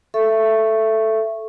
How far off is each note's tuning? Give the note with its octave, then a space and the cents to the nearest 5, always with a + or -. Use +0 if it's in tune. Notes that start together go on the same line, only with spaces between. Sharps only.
A4 +0 E5 +15 C#6 -10